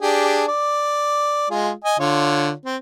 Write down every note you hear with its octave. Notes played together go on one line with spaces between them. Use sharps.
D4 G4 G#4
D5
G#3 F4 G#4
D#5 G#5
D3 F4 C#5
C4